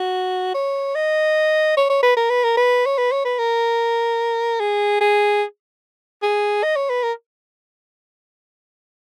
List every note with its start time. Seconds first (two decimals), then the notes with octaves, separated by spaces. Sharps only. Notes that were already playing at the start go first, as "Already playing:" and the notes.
Already playing: F#4
0.54 C#5
0.96 D#5
1.77 C#5
1.90 C#5
2.03 B4
2.17 A#4
2.30 B4
2.44 A#4
2.57 B4
2.86 C#5
2.98 B4
3.12 C#5
3.25 B4
3.39 A#4
4.60 G#4
5.01 G#4
6.22 G#4
6.63 D#5
6.76 C#5
6.90 B4
7.03 A#4